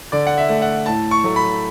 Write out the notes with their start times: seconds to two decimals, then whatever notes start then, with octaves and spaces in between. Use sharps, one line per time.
0.12 D3 D5
0.27 F#5
0.38 E5
0.49 A3
0.62 F#5
0.86 A2 A5
1.11 C#6
1.24 F#3 A3
1.36 B5